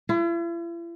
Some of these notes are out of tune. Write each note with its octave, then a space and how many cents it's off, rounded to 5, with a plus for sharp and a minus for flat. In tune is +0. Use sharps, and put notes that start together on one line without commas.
E4 +45